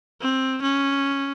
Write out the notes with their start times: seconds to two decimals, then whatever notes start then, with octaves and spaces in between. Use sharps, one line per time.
0.21 C4
0.62 C#4